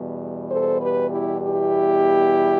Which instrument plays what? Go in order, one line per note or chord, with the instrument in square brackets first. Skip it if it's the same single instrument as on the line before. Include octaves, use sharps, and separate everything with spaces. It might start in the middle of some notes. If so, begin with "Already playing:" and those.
Already playing: [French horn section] E2 B2 G3
A4 C5
G4 B4
E4 G4
E4 G4